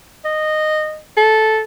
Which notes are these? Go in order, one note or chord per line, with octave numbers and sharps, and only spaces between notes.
D#5
A4